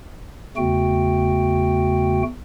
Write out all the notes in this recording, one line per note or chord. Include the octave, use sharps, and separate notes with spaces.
E2 C#3 A3 F#4 G5